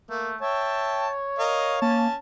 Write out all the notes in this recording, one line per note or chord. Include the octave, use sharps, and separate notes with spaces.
A3 A#3
C#5 E5 G5 A5
A#4 D#5 F5
A#3 C#4 A5